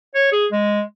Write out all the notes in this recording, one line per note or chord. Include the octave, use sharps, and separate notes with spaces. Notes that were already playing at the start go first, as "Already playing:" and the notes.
C#5
G#4
G#3